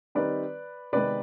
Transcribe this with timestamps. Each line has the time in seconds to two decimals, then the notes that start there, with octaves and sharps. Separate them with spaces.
0.15 D#3 G3 C4 D#4 B4 D5
0.93 C3 D#3 G#3 B3 B4 D5